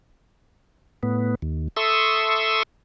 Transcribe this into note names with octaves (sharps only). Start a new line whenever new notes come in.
A2 B3
D#2
A4 E5 C6 C#6 D#6 E6